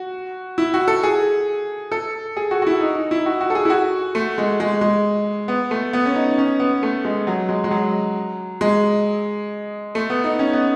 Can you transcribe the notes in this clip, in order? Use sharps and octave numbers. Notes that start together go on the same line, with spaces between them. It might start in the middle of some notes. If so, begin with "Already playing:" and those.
Already playing: F#4
E4
F#4
A4
G#4
A4
G#4
F#4
F#4
E4
D#4
D#4
E4
F#4
F#4
A4
G#4
E4
F#4
A3
G#3
G#3
G#3
B3
A3
B3
C#4
D#4
C#4
B3
A3
G#3
F#3
G#3
G#3
F#3
G#3
A3
B3
D#4
C#4
B3